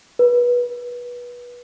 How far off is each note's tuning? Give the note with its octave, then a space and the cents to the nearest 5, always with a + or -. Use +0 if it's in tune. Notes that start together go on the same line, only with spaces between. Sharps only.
B4 -25